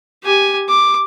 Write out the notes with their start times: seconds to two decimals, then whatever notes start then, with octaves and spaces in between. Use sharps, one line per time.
0.23 G4 G#5
0.69 D6